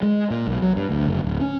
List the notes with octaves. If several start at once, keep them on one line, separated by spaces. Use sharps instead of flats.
G#3
A#2
B1
F#3
G2
D2
F#1
D1
C#4